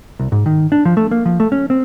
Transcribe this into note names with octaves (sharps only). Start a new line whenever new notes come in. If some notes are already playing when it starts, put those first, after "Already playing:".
C2
G#2
D#3
D4
F3
A3
A#3
F3
A3
C#4
C4